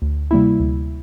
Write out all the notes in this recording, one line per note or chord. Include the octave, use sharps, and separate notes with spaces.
D2
C3 G3 A#3 E4
D2